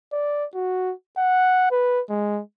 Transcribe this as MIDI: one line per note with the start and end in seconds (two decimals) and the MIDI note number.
0.13 0.45 74
0.54 0.93 66
1.17 1.71 78
1.71 2.01 71
2.09 2.41 56